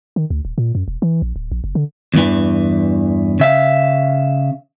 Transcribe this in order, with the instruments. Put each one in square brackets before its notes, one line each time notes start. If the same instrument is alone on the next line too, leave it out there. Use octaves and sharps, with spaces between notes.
[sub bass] D#3
D2
D#1
A#2
F#2
E1
E3
A#1
D1
A#1
F#1
D3
[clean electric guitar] E2 G2 E3
C#3 E5 F5